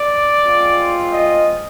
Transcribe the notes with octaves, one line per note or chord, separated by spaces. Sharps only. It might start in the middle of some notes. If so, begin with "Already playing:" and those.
Already playing: D5
G#3 C4 F4
D#5